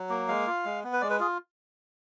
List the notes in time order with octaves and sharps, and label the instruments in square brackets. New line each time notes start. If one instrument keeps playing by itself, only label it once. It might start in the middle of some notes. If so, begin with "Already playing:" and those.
Already playing: [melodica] F#3
A#3
G#3 F5
F4
G#3
B3
B4
G#3 D5
B4
F4 G#4